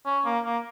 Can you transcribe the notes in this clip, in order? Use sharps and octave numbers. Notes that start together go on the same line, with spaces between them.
C#4
A#3
A#3